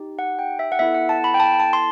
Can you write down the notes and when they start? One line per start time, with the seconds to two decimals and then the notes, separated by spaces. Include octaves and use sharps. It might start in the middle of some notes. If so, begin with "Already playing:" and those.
Already playing: D#4 G4
0.19 F#5
0.39 G5
0.59 E5
0.72 F#5
0.79 B3 E4 A4 E5
0.94 F#5
1.09 A5
1.24 B5
1.34 G5
1.40 A5
1.60 A5
1.73 C6